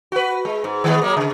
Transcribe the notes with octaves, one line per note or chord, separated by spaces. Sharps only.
F#4 B4
G#3
G#2
D#3 G#3 B3
F#3 G#3 A#3
C#3